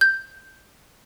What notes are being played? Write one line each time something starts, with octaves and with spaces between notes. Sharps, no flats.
G6